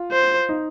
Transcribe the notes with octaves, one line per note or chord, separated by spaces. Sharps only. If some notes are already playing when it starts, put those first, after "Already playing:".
Already playing: F4
C5
D#4